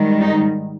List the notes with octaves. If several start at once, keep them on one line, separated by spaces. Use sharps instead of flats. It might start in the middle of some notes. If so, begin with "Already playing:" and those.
Already playing: G#2 D#3 G3
D#4